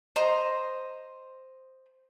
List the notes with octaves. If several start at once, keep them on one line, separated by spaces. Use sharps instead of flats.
C5 D#5 A#5 C6